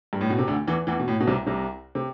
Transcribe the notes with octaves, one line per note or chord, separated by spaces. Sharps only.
G2
A2
B2
C3
D2 D3
E2 E3
E2 E3
B2
A2
B2
C2 C3
C2 C3
C3